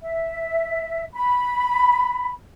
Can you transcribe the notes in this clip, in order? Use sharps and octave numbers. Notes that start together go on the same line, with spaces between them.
E5
B5